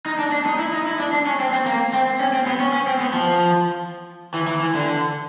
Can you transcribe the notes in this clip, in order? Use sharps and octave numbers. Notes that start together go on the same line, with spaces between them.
D#4
D4
D4
D#4
E4
D#4
E4
D4
D4
C#4
C4
C4
A#3
C4
C#4
C4
B3
C#4
C#4
C4
B3
F3
E3
E3
E3
D3